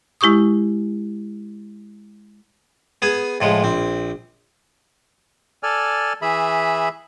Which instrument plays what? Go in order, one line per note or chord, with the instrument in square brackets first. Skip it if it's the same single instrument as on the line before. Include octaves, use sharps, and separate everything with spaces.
[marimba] G#3 E4 G4 C#6 D#6
[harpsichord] B3 G#4 G#5
A2 F3 G#3
A#1 C4
[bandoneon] A4 D5 G#5 F6
E3 G#4 E5 B5